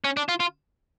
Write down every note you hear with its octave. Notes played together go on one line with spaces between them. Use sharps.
C#4
D4
F4
F4